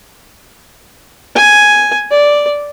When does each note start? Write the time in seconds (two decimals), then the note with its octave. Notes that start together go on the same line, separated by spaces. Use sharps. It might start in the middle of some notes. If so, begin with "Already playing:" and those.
1.35 G#5
2.11 D5